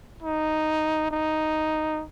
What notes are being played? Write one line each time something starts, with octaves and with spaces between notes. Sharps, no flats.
D#4
D#4